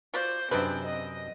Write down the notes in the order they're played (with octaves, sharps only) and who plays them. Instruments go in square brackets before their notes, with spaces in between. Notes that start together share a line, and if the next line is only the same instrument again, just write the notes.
[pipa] F4 F#4 D5 [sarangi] C5
[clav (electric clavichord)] F#2 C3 [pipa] G#3 D4 B4 [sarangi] C4
[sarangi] D#5